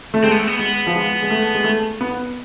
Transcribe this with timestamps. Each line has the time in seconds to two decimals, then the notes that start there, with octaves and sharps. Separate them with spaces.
0.14 A3
0.24 G#3 C4
0.31 B3
0.39 A3
0.47 B3
0.59 G#3 B3
0.87 F3
0.95 G#3
1.22 G#3
1.30 A3
1.55 G#3
1.64 A3
2.01 B3